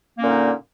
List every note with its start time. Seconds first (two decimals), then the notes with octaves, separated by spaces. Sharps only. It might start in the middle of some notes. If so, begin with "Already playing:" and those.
0.18 A#3
0.21 C#4
0.24 A#2
0.26 D3
0.29 D#4